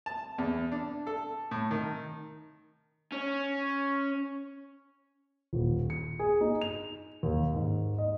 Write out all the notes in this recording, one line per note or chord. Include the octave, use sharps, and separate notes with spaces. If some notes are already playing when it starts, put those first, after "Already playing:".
A5
E2
D4
A4
A2
D#3
C#4
D#1
C#7
G#4
D#4
F7
D#2
G#2
D#5